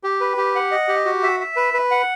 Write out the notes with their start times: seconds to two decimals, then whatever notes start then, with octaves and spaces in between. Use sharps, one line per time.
0.04 G4
0.21 B4
0.37 G4
0.55 F#5
0.71 D#5
0.88 G4
1.05 F#4
1.23 E5
1.40 E5
1.56 B4
1.74 B4
1.91 F#5